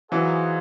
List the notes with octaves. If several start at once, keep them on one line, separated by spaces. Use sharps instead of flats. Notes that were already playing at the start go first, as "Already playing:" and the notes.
E3 F#3 D#4 G#4 C5 F5